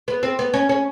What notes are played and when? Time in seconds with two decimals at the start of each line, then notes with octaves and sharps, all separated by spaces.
0.08 B3
0.23 C4
0.39 B3
0.54 C#4
0.69 C#4